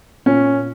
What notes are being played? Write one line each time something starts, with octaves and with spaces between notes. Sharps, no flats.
A#2 C#4